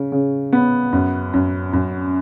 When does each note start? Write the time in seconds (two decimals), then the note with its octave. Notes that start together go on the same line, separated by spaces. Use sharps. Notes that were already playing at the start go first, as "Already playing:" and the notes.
Already playing: C#3
0.12 C#3
0.53 B3
0.93 F#2
1.34 F#2
1.73 F#2